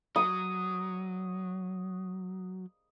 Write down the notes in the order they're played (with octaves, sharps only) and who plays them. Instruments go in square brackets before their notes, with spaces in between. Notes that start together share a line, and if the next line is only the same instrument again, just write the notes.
[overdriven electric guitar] F#3 [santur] D#6